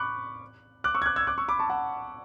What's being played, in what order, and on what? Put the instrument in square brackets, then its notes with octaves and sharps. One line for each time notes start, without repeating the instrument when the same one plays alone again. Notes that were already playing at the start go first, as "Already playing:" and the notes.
Already playing: [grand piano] B5 C#6 D6 F#6
D6 F#6
C#6 E6
G#6
D6 F#6
E6 G#6
D6 F#6
C#6 E6
B5 D6
A5 C#6
F#5 A5